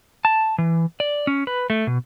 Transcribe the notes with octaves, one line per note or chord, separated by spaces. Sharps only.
A5
E3
D5
C#4
B4
A3
B2